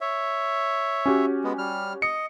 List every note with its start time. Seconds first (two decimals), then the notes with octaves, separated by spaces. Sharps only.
0.01 C#5 E5
1.06 C#4 F#4 G4
1.44 G#3 B3
1.58 G3 F6
2.02 D#5 C#7